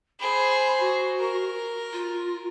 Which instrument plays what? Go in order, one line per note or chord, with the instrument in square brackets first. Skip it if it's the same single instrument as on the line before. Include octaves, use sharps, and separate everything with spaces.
[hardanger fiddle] G#4 C5 [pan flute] B5
[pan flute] F#4
[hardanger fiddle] A#4
[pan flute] F4